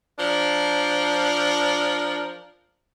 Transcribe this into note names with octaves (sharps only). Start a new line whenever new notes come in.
F3 D4 A#4